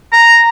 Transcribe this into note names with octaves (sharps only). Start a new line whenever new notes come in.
A#5